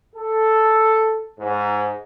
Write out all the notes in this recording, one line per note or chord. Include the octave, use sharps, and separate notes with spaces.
A4
G#2